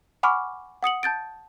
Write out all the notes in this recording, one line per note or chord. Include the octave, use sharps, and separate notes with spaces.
F#5 G#5 B5 C#6 D6 F6
F#5 D#6 C#7 F#7
A5 G6 A6 D7